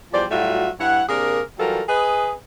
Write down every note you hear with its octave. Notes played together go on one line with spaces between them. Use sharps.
E2 F3 G3 C5 D5
A2 F#3 G3 F4 F#4 E5
G2 E4 C#5 F#5
C3 A#3 D4 G#4 A#4
E3 F#3 G3 F4 A4 A#4
G#4 B4 D#5